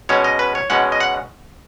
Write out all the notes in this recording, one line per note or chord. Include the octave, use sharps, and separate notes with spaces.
B2 G#3 C#4 C#5
D#5
B4
C#5
B2 G#3 C#4 F#5
D#5
F#5